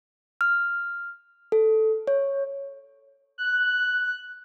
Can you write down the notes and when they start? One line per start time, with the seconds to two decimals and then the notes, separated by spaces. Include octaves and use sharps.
0.41 F6
1.52 A4
2.07 C#5
3.38 F#6